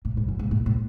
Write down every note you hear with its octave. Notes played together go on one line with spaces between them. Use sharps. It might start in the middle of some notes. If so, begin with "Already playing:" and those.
A2
G#2
F#2
G#2
A2
A2